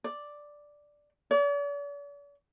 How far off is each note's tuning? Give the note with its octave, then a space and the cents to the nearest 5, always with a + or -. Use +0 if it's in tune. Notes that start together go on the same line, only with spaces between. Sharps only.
D5 +0
D5 -45